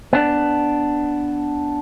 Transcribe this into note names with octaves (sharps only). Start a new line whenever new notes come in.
B3 D4